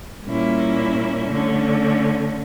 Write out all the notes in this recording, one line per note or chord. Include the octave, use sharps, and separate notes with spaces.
A#2 G3 A#3 C#4 E4
D3 A3 C#4